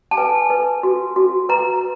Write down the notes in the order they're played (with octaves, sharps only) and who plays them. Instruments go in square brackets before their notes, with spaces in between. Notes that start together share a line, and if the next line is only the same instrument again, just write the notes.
[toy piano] A5
B4 G#5
B4
F#4
F#4
B4 A#5